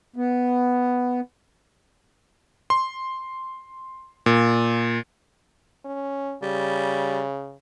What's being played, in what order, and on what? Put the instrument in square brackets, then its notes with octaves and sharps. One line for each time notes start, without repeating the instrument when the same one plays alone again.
[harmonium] B3
[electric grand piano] C6
A#2
[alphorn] C#4
[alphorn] C#3 [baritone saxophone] G3